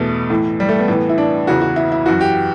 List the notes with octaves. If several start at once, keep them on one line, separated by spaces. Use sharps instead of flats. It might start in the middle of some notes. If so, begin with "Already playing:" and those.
Already playing: E2 B2 A3
A2 E3
G3
A3
B3
A2 E3
E4
D4
E2 C#3 E3 F#4
F#4
E4
E4
F#2 E3 F#4
G4